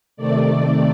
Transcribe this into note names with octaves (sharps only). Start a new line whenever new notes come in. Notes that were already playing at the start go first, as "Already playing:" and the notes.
C3 D#3 A3 D5